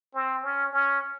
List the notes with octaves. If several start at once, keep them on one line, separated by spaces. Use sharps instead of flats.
C4
C#4
C#4